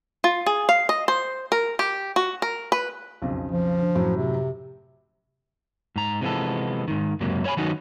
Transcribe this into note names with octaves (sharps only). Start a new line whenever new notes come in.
F4
G#4
F5
D#5
C5
A#4
G4
F#4
A#4
B4
B1 F2 C#3
F3
D3
F#2 A2 F#3
C3
G#2 A#5
C3 E3 F3 G#3 B3 A4
G#2 D#3
C#2 F#2 C3 F#3 A#3
E4 C#5 F5 G#5 B5
D#3 F#3 B3 C#4 D#4 F#4